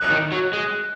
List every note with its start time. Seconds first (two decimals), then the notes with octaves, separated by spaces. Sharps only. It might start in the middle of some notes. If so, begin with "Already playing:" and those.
Already playing: F#6
0.10 D#3
0.32 F#3
0.53 G#3